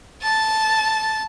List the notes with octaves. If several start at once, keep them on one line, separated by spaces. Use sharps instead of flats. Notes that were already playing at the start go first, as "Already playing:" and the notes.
A5 A6